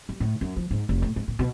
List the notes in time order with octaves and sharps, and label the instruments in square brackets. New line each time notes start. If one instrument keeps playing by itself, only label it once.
[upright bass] G3
A2
F#2
F3
G#2
F1
A2
G#2
A#2
B2